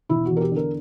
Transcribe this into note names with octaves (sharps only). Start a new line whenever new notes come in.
E1 E4
F#4
E2
A#4
G4
D3 A#4